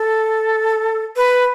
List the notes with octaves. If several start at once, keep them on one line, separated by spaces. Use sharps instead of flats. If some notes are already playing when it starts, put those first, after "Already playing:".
Already playing: A4
B4